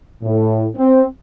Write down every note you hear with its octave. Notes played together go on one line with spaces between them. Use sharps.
A2
C4